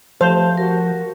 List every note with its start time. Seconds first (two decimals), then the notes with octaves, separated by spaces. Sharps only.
0.21 F3 A3 G4 C5 F5 A5
0.57 F#4 A#4